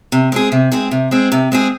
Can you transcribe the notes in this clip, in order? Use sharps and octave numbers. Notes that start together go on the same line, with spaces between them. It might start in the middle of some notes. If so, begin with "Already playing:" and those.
C3
G#3 C4 G#4
C3
G#3 C4 G#4
C3
G#3 C4 G#4
C3
G#3 C4 G#4